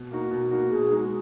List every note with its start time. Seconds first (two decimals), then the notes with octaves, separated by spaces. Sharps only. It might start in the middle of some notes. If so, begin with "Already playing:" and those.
Already playing: B2
0.11 A#3 D#4 F#4
0.31 B2
0.51 A#3 D#4 F#4
0.70 B2 G#4
0.91 G#3 D#4 F#4